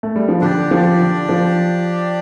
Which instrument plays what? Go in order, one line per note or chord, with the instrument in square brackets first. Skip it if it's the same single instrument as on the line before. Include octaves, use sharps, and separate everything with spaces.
[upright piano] A3
G3
F3
[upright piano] D3 [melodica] D4 G4 D5
[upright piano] F3
D3
F3